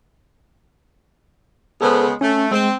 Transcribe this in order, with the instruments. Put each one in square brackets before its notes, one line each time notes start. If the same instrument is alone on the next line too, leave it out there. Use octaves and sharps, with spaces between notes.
[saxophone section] C#3 G#3 B3 [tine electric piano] G#4 A4 C5
[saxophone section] A3 [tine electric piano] C#4
[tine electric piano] G#3 [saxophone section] C4